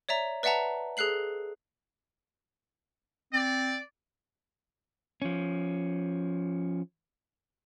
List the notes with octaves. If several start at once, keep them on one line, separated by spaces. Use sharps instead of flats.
C#5 D5 E5 A#5
B4 D5 E5 F#5 A5 A#5
G#4 A4 F#6 C7 F#7
C4 D5
F3 C#4